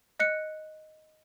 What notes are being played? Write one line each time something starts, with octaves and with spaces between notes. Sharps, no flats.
D#5 F#6 C#7